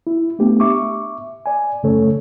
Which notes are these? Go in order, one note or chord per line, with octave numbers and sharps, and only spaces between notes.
E4
A3 B3 D4 G4
E5 C#6 D6
D5 G#5
F#2 C#3 A3 C#4 A4 C#5